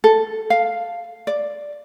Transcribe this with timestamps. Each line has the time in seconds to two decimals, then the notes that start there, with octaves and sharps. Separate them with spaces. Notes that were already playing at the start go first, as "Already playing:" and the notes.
0.04 A4
0.50 F5
1.27 D5